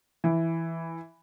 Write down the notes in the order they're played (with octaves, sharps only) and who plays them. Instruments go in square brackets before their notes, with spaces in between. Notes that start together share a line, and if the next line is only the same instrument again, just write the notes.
[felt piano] E3